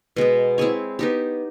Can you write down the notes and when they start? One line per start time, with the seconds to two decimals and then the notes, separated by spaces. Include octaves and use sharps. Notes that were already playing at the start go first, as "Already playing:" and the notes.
0.16 B2 G#3 B3
0.58 C4 E4 G#4 C#5
0.99 B3 D#4 G4